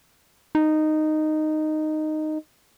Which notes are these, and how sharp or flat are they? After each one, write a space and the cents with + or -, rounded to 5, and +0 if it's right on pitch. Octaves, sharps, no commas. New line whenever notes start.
D#4 -10